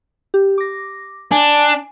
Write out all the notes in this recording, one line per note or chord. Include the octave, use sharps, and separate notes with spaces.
G4
D6 A#6
D4 G#5